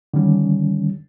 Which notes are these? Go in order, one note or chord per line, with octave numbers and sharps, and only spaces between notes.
D3 D#3 G3 C#4